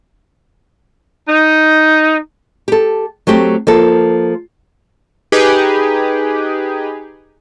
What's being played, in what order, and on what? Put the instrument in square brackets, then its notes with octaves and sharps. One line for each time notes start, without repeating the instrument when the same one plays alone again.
[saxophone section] D#4
[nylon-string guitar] G4 A4
F#3 A3 C4 G4
F3 A#3 A4
[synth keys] D#4 G4 G#4 B4